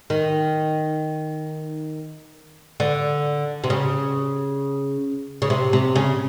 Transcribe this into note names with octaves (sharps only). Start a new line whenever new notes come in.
D#3
D3
C3
C#3
C#3
C3
C3
C#3